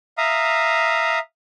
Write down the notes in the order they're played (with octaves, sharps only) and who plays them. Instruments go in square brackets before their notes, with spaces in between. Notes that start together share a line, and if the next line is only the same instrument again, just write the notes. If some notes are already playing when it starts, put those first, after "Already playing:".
[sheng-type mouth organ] E5 F5 A#5 D#6